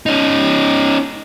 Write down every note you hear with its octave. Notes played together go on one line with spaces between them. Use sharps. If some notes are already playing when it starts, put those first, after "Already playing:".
C#4 D#4